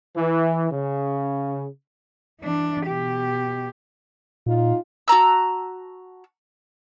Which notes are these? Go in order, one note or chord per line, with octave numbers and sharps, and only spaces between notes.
E3
C#3
E3 D4
B2 G4
A#2 D#4 F4
F#4 A5 A#5 E6